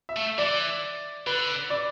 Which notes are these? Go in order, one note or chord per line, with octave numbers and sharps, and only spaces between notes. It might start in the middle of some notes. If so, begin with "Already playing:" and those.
E5
A3
E3 D5
D3 B4
D5